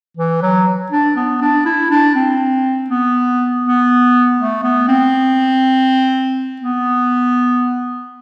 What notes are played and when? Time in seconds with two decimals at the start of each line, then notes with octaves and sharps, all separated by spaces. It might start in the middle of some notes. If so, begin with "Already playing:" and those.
0.17 E3
0.42 F#3
0.92 D4
1.16 B3
1.41 D4
1.66 E4
1.91 D4
2.15 C4
2.90 B3
3.64 B3
4.39 A3
4.63 B3
4.88 C4
6.61 B3